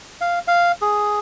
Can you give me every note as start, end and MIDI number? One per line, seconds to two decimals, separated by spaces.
0.21 0.39 77
0.48 0.72 77
0.81 1.20 68